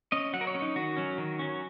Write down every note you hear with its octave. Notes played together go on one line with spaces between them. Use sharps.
C#4 D#5
F#3 F#5
A#4
C#5
C#4
D#4
D#3 F#4
F#3 C#4
D#3
F#3 C#4